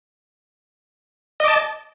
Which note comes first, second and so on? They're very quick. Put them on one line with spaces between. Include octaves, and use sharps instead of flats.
D#5 D6 A5